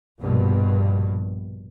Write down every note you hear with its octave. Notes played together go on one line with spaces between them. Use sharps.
A#1 G2 B2